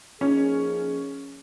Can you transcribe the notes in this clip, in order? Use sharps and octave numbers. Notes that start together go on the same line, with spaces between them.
F3 A#3 C#4 D#4 G#4